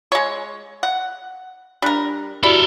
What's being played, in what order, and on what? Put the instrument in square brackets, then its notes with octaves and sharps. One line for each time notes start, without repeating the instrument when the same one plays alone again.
[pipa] G#3 C#5
F#5
[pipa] G3 A#4 [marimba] D4 F#6
[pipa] E4 [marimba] F#4 G4 D5 [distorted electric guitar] A4 A#4